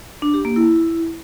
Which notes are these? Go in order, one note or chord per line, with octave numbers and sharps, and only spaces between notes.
D4
G4
A#3
E4